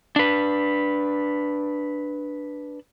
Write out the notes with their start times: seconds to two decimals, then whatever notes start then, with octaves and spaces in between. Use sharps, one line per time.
0.16 D4 B4